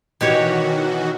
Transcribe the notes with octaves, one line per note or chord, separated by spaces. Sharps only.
B2 D#3 E3 F#4 G4 C#5